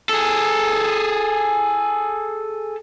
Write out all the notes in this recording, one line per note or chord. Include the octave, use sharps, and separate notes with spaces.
G#4 A4